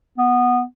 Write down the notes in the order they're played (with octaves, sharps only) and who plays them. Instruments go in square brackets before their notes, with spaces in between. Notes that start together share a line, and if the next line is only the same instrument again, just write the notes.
[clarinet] B3